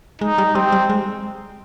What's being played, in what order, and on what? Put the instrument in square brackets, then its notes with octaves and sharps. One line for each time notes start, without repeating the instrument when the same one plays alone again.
[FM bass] G#3 [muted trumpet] D#4
[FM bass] G3
[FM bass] G3 [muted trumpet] C4
[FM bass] G3
G#3